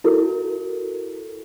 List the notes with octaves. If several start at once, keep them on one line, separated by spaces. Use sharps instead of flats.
E4 F#4 A4 A#4